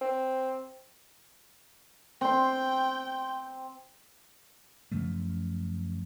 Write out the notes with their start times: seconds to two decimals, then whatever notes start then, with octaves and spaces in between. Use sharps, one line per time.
0.01 C4
2.21 C4 G5 C6
4.92 F#2 C#3 F3 A3